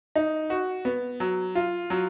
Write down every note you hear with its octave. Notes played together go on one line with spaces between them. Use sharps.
D#4
F#4
B3
F#3
F4
F#3